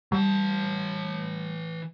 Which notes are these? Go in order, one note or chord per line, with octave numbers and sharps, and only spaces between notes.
E3 G3 A5